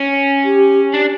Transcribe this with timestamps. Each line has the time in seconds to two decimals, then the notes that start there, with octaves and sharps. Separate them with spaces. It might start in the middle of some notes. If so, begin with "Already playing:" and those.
Already playing: C#4
0.45 G4
0.94 D4